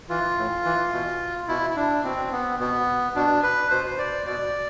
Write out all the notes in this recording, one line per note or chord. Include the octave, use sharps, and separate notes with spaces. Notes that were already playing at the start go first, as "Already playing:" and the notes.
E3 F4
A2
E3
B2
B2 E4
E4
D4
B2 C4
B3
B2 B3
B2 D4
B4
B2 C5
C5
D5
B2 D5